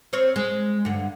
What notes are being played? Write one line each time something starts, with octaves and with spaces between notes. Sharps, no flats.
C4 A#4 C#5
G#3
G2 D3